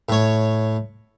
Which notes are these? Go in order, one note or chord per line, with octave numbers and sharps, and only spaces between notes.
A2 C#5